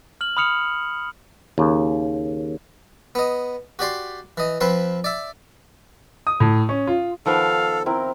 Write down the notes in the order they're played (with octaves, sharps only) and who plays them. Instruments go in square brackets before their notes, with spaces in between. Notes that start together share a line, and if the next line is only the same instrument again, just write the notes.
[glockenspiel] F6 F#7
B5 D#6 F6 C#7 F7
[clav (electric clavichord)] D#2 C#3
[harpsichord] B3 D#5
F#4 G4 D5 C6
E3 D#5
F3 C4 B4 C6
D5 E5
[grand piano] D#6
A2
C#4
F4
[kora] D#3 F3 B3 [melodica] A4 [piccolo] F5
[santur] C4 E4 A#4